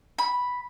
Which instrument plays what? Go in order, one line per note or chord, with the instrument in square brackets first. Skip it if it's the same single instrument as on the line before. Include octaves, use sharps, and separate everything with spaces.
[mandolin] B5